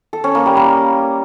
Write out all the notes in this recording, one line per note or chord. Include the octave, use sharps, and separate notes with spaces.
A4
C#4
A#3
G3
A#3